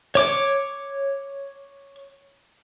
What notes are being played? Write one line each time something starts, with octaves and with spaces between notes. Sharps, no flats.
C#5 D6